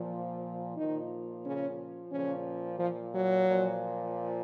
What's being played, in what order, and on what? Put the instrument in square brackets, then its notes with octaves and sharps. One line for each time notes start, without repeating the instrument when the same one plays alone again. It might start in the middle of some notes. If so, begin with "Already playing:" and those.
Already playing: [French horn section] A#2 F3
A#2 D#3 F3 D#4
C#3 C#4
A#2 C#3 F3 C#4
F3
F#3
A#2 F3